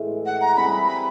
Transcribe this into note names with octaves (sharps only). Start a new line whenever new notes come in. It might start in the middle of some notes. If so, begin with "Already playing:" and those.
Already playing: A2 E3 G#3
F#5
A#5
G3 C4 E4 G#4 B5
B5